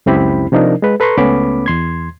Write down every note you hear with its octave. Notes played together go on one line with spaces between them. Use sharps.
C#2 F#2 C4 E4 G4 B5
C3 F3 D4 D#4 A#4
G#3 B4
A4 B4 A#5 C6 C#6
C#2 A3 B3 C#4 B5 D6
E2 C6 G#6